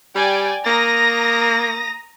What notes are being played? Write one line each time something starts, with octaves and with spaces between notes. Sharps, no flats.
G3 D5 G5 G#5
A#3 A#5 D#6 A#6